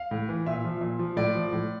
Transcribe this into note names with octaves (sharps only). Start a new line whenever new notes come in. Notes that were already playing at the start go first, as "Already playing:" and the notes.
Already playing: F5
A2
E3
A#2 E5
F3
A#2
F3
A2 D5
F3
A2